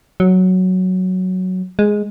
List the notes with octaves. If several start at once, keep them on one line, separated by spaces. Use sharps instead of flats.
F#3
G#3